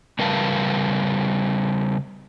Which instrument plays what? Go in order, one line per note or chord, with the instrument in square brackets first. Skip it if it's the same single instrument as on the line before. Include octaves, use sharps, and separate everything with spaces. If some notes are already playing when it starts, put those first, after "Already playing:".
[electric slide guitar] C#3 G3 A#4 B4 F5 A5